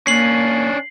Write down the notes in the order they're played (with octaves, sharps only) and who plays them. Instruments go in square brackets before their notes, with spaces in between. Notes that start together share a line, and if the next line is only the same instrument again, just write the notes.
[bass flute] A#3 [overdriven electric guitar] C#4 D4 [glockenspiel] C7 F#7